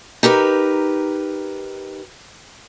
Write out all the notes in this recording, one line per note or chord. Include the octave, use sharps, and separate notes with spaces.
D#4 G4 A#4 B4